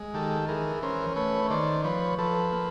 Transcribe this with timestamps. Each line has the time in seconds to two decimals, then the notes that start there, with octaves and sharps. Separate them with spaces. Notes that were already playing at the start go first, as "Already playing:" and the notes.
Already playing: G#3
0.14 D#3 G4 A4
0.48 E3 G#4 A#4
0.83 C#4 A#4 C5
1.16 A3 B4 C#5
1.50 D#3 C5 D5
1.84 F3 B4 C#5
2.18 F3 A4 B4
2.53 A#3